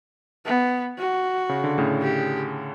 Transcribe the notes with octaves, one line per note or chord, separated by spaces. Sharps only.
B3
F#4
C#3
D3
A2 C#3
G4